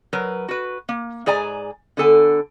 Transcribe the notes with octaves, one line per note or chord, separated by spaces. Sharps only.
F#3 A#4 B4
F#4 B4
A#3
G#2 G#4 D5 G#5 A#5
D3 B3 A4 G#5